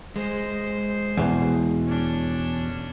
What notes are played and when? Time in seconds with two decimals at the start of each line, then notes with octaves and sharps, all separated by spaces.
0.16 G#3 C5
1.17 E2 B2
1.86 C#4 D4